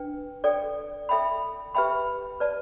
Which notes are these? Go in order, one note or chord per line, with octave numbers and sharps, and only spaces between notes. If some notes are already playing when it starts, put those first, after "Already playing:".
Already playing: D4 B4 G5
A4 D5 G5
A4 E5 G5 B5
G4 B4 E5 G5 B5
B4 D5 A5